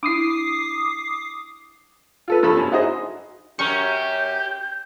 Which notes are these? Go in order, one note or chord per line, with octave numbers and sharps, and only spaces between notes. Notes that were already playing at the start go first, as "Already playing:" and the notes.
D4 E4 D6 D#6 C7
F4 A4 B4
G2 F3 A4 B5
F#2 C#4
D#4 E4 F#4 G#4 C5 D#5
F#2 C#4 G4 A#4 C#6 G6